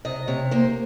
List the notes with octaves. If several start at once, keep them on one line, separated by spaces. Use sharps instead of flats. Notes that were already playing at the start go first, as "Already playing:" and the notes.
C3 D#5
C3 C#5
A#3 C5